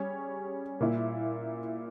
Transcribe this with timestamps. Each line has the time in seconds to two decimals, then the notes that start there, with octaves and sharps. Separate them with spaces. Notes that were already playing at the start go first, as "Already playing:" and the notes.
Already playing: G3 C#4 G#4 C#5
0.80 A#2 A#3 E4